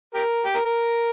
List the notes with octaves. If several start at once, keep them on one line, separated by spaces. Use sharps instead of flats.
G4 A#4
G4
A#4
A#4